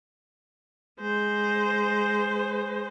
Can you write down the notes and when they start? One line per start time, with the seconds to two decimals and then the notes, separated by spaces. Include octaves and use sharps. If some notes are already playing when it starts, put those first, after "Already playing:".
1.00 G#3 C5